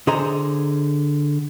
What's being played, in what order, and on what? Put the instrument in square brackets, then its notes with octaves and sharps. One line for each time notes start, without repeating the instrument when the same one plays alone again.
[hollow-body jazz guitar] D3 G#4 C5 D#5 A#5